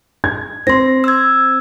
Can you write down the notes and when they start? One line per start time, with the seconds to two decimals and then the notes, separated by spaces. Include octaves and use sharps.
0.24 G#6
0.67 C4 C6 A#6
1.04 E6 G#6